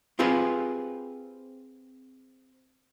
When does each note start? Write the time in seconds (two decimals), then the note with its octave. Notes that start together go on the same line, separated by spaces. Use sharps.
0.19 C4 F4 G4 G#4 B4 C5